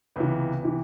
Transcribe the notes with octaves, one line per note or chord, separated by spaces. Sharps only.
C#2 C3 E3 B3
C3 E3